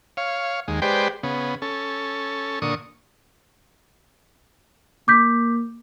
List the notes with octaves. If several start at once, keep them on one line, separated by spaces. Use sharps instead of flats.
C#5 F5
D#2 G#3
G#3 G4 B4 C5 D5 G5
C#3 B3
C#4 A4
A#2 D3 C#6 D#6
A#3 D6 G6 B6